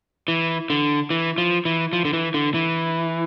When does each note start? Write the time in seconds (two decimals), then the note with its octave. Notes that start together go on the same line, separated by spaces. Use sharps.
0.28 E3
0.70 D3
1.10 E3
1.38 F3
1.65 E3
1.93 F3
2.05 D3
2.13 E3
2.34 D3
2.54 E3